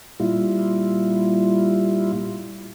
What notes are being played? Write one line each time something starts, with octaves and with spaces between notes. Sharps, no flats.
A#2 G3 E4 F4